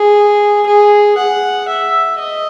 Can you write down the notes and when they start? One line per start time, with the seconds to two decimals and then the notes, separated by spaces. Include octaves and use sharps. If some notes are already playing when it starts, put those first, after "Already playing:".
Already playing: G#4
0.67 G#4
1.17 F#5
1.68 E5
2.19 D#5